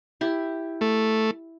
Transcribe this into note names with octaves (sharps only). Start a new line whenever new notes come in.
E4 G4
A3